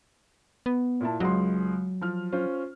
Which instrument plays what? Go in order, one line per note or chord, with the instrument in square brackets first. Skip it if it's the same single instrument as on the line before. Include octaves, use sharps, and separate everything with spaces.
[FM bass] B3
[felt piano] A#2 E4 A5
[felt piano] C#2 G#3 C6 [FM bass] F#3
[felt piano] F3 F6
C#4 F4 C5